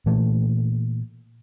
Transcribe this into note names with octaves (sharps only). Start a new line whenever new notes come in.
A#2 E3 A3